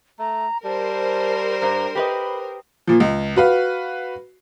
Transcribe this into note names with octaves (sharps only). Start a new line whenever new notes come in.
A3 A#5
G3 A#4 C5 A5
G2 A#5
G4 B4 D#5 B5
A#2 F3
C#2
F#4 B4 F5